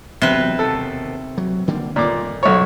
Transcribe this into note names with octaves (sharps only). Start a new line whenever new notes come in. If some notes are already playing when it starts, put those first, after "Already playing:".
E1 B1 F2 C3 B4
D#2 B2 A4
F#3
D3 G3 A#3
G1 F2 A#2 D#3 D6
B1 C#5